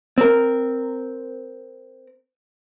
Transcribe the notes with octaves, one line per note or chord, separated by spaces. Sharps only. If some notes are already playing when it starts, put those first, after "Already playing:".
C4 A#4